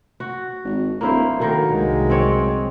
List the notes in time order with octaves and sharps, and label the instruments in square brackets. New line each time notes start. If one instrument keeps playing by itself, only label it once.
[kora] F#4
[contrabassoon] G#1
[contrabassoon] D1 [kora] A#3 E4 C5
[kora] D3 D#3 A#4 [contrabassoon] F#3
[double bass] C2 G#3
[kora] C4 C#5 D5